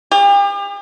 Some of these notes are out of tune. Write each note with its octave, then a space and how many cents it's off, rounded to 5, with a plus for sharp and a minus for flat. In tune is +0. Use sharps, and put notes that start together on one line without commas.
G4 +40